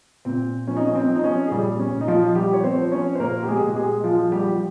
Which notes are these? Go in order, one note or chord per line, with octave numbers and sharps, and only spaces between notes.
A#2 C4
F3 C#4
D#4
C#4
C4
F3
D#4
C#4
G#4
A#2 G3 G4
C#4
A#2
D#4
F3 F4
F3 G3 G4
C#5
C4 C5
F3
C#4 C#5
C5
A#2 A#3 A#4
G4
G#3 G#4
A#2
G4
G#3 G#4
F3 F4
G3 G4
F3